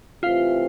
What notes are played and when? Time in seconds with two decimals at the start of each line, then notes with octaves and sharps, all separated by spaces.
0.23 C3 E3 A3 C4 F4 F5